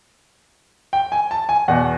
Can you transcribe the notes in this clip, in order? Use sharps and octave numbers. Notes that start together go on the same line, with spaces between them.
G5
G#5
A5
G#5
E2 B2 F#5